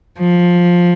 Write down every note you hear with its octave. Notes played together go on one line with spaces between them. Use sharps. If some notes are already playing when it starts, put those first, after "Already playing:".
F3